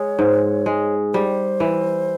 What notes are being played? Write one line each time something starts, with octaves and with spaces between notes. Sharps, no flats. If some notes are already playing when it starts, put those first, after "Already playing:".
Already playing: G#3 C#5
G#2
G#3
G3 C5
E3